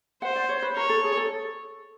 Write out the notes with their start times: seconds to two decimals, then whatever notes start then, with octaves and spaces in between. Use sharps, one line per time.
0.22 C5 F#5
0.36 D5
0.49 C#5
0.62 B4
0.76 A#4 C#5
0.89 A4
1.04 G#4
1.17 A4